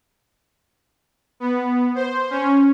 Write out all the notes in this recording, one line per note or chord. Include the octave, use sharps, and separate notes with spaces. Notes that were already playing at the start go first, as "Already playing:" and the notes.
B3
C5
C#4